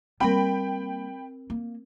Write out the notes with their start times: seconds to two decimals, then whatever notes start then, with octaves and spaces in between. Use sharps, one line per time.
0.20 G3 A#3 C4 A#4 G5 B5
1.50 A#3